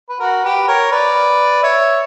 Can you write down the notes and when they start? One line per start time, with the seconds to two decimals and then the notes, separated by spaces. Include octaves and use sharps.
0.10 B4
0.20 F#4 A#4
0.43 G4 B4
0.68 A#4 C#5
0.91 B4 D5
1.63 C#5 E5